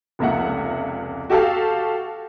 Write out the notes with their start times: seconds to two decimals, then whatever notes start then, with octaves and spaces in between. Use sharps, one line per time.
0.19 F1 C#2 A#3 E5 F#5
1.30 F#4 G4 A4 F5 A5